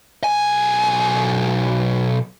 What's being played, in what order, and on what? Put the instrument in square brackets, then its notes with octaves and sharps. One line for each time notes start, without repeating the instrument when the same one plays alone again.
[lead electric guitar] B1 G#5